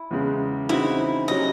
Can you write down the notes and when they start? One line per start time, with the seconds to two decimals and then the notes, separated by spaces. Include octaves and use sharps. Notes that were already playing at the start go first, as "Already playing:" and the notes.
Already playing: E4
0.11 E2 C#3 G#3
0.69 C#3 E3 C4 D#4 E4 F#4
1.28 C3 F#3 C#4 D#5